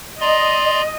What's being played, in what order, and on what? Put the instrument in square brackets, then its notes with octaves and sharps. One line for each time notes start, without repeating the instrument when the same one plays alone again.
[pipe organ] D5 A#5 C6 [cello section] D#5